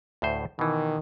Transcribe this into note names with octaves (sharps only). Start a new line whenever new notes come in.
D2 A2 C5
B2 D#3 E3